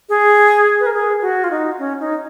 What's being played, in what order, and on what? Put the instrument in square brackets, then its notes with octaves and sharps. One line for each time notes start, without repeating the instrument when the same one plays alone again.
[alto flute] G#4
B4
A#4
G#4
F#4
F4
D#4
C#4
D#4